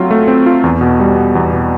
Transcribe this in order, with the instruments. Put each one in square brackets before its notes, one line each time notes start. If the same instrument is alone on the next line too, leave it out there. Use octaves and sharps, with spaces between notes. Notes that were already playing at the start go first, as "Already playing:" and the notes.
Already playing: [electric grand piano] F#3 A3 C4 F4
A3
C4
F4
E2
B2
G3
B3
E2
B2